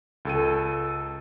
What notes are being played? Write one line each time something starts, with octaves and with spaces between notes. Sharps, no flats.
C#2 A4 D#7